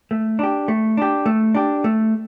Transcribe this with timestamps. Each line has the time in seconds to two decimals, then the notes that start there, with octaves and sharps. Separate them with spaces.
0.11 A3
0.39 D4 G4
0.68 A3
0.97 D4 G4
1.26 A3
1.55 D4 G4
1.84 A3